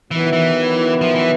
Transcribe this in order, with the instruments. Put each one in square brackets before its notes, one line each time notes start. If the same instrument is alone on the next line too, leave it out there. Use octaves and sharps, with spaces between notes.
[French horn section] D#3 F#3 B3 E4 [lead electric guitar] E3
[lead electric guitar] E3
F3
E3